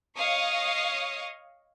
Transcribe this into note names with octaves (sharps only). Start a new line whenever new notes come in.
C#5 D#5 F5 C#6 D#6